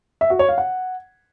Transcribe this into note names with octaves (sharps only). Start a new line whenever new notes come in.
E5
F#4
C#5
F5
F#5